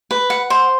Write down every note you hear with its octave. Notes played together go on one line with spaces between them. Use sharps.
B4
F#5
C5